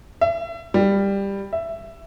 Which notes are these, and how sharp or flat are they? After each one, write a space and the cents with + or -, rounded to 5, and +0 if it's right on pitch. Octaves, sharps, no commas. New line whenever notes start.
E5 +30
G3 +15
E5 +10